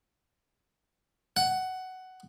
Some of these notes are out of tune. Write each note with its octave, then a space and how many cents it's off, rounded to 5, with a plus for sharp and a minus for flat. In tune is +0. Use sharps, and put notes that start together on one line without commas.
F#5 +10